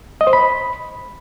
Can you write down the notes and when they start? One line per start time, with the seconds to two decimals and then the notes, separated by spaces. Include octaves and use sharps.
0.21 D#5
0.27 C5
0.33 B5